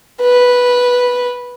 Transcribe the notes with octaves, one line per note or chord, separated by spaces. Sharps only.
B4